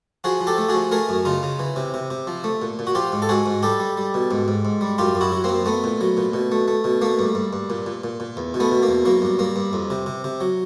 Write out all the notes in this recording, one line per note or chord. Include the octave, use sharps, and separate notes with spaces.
F3 F#4 G#4
F3
G4 A4
A3
F#4 G#4
F3
A3 G#4 A#4
F#2
C#3 D#4 F4
C#3
E3
C3
C3
C3
F3
A3
A#2
A#2
F#4
F3 F4 G4
G#2
A4
G#2 F#4 G#4
G#2
G3 G4 A4
G3
G3
B2
G#2
G#2
G#2
G3
F#2 F4 G4
F#2
E4 F#4
F#3
F#2 A#3 C4
A3 B3
A#2
F#3
A#2
B2
A3
A3
B2
A3 A#3
G2
G2
G2
A#2
A#2
A#2
A#2
E2
B2
A3 B3
B2
A#3
E2
F#3 A#3
G2
G2 A#3
G2
F2
C3
C3
C3
F#3